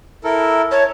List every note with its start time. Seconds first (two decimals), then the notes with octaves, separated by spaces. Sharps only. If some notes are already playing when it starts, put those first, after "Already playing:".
0.24 E4 A4 A#4
0.71 C#5 A5